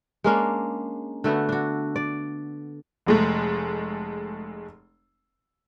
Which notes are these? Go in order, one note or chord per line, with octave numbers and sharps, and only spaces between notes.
G#3 A#3 C#4 D4
D3 A3 B3 F#4
D4 F#4
D5
F1 G#3 A3